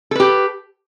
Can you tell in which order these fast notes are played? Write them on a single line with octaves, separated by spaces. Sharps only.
A4 B4 G4